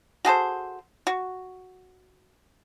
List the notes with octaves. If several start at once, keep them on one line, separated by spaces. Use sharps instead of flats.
F#4 G#4 A4 C5
F#4